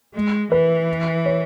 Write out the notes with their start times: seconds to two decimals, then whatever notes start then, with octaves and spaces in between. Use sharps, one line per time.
0.15 G#3
0.51 E3 B4
1.26 C#5